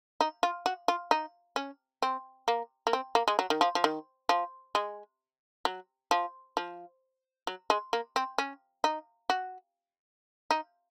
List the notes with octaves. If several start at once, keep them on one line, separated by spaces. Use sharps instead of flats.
D#4
F4
F#4
F4
D#4
C#4
C4
A#3
A#3
C4
A#3
G#3
F#3
D#3
F3
F3
D#3
F3
G#3
F#3
F3
F3
F#3
G#3
A#3
C4
C#4
D#4
F#4
D#4